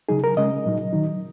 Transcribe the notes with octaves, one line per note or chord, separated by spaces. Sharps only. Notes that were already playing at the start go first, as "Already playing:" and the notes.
C#3 F#3 D#4 G#4
A#4
C#3 G#3 C#4 D#5
A#2 F#3 D#4
D#3 F#3 D#4